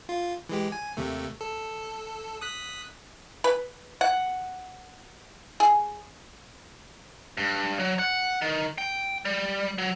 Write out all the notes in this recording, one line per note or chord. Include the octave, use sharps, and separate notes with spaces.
F4
E3 G#3 G4
G#5
D#2 C3 A3
A4
D#6 F#6 B6
B4
F#5
G#4
G2
F#3
F#5
D#3
G5
G3
F#3